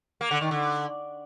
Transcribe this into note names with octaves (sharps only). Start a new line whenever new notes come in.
A#3
D3
D#3
D3